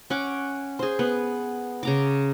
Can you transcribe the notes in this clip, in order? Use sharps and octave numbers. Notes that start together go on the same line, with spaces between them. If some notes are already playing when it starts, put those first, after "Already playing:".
C#4 F#5 D6
G#4 C5
B3
C#3 A#5 D6